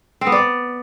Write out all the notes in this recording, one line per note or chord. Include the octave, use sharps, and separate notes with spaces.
C4
B3
D5